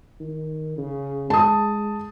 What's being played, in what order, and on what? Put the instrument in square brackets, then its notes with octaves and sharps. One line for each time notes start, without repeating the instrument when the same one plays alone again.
[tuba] D#3
C#3
[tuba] G#3 [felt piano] A5 D#6